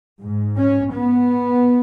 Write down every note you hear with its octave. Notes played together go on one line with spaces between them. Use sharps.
G#2
C#4
B3